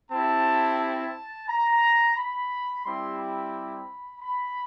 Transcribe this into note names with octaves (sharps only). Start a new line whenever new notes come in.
C4 E4 G4 A5
A5
A#5
B5
G3 C4 E4 G4 C6
B5
B5